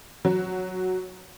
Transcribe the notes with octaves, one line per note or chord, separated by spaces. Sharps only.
F#3